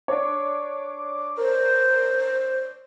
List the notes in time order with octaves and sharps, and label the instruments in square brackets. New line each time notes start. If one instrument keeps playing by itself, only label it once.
[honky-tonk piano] D4 C#5 [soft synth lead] D6
[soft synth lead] A#4 [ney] C5